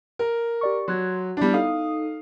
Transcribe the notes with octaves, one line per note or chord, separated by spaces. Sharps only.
A#4
G4 D5 C#6
F#3 C6 F#6 G#6
G3 B3 D4 E4
D#4 A4 F5 D#6